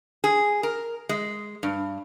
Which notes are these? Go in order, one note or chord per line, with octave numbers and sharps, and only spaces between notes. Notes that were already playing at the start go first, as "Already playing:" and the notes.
G#4
A#4
G#3
G2